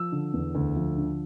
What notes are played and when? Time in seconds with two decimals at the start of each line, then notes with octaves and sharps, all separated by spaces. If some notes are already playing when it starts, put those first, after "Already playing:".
Already playing: F3 E6
0.12 D3
0.33 E2
0.55 D2
0.76 F3
0.98 D3